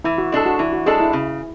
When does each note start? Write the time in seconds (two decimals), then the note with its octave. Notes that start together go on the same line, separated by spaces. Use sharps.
0.04 E3 E4
0.18 F#4
0.32 G#3 D4 A4
0.46 F#4
0.59 E3 E4
0.73 F#4
0.86 G#3 D4 G#4 A4
1.00 E4
1.13 C#3